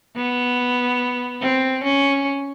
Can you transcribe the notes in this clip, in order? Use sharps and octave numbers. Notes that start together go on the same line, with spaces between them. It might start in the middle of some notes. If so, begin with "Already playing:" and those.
B3
C4
C#4